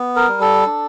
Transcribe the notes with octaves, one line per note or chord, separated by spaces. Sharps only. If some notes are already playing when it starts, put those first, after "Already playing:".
Already playing: B3
A#4
G3
A4
D4